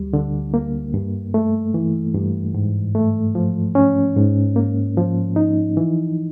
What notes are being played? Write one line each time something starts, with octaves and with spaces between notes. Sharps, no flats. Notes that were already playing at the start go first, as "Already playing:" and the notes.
Already playing: D2 G3
D3
A#3
G2
A3
E3
G2
G#2
A3
F3
C#4
G#2
A#3
F3
D#4
E3